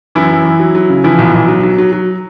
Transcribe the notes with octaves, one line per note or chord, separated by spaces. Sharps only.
F#2 E3 E4
F#2
E3
F#3
F#3
C#3
E3 F3 E4
B1
B1
F#3
F#3
F#3
F#3